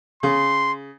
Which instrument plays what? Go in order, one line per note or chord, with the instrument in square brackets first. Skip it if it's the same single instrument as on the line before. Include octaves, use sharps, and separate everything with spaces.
[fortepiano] C#3 [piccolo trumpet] C6